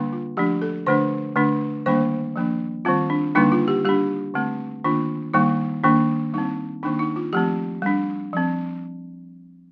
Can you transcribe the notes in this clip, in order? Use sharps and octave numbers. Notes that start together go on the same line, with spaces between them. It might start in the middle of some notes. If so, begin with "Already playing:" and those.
Already playing: D3 G3 A#3 D4
F4
F3 A3 D4 G4
A4
D3 A3 D4 C5
D3 A3 D4
D#3 G3 A#3 D4 C5
F3 A#3 D4
D#3 G3 C4 F4
D4
D3 G3 A#3 D4 D#4
F4
G4
G3 D4 G4
D3 A3 C4
D#3 A#3 D4 F4
D#3 G3 A#3 D#4
D#3 A#3 D4
G3 C4 D#4
D#3 A#3 D4 D#4
D#4
F4
F3 A3 C4 G4
G3 D4
F3 C4